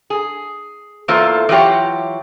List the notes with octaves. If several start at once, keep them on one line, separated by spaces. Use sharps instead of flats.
G#4
E2 E3 A#3 F4 A4 C5
E3 F#3 F4 G4 C#5